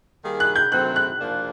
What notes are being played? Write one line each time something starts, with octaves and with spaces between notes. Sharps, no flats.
D#3 G3 A#3 D#4 G#4
F#6
G6
D#3 F#3 A3 C4 F#6
F#6
F3 A#3 D4